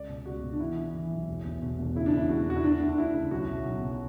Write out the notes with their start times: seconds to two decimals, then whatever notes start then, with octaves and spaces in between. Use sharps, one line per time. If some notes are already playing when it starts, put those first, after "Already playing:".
Already playing: C#2 D5
0.09 B2
0.25 C#2 F#4
0.42 B2
0.53 D4
0.60 E3 E4
0.77 E3
0.94 E3
1.11 B1
1.28 E1
1.45 E1
1.62 B2
1.79 E1
1.95 C#3 E4
2.06 D4
2.12 E2 E4
2.29 E1 F#4
2.47 E1 F#4
2.57 E4
2.63 D2 D4
2.81 D2
2.88 D4
2.98 D2 E4
3.14 C#3
3.31 B1 F#4
3.49 B2
3.65 B1
3.82 B2